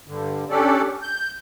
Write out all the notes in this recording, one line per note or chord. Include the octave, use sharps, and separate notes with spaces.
G2 D3
C#4 D4 G4 A4 D5
G6